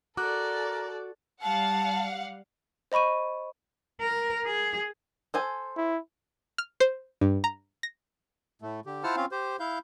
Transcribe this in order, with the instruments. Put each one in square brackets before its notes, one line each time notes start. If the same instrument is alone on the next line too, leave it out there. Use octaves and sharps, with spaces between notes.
[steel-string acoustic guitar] F#4 [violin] A4 D5 [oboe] A#4 [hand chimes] D6 F#6
[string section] G3 F5 F#5 [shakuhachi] A5
[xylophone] C5 D#5 B5 C#6 D#7
[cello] A#4
G#4
[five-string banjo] A4 C5 G#5
[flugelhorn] E4
[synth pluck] F6
C5
G2
A#5
A#6
[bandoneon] A2 A3
D3 G4
E4 F4 C5 F#5 A5 F6
C4 C#4 F4 F5
G4 C5
E4 F5 G6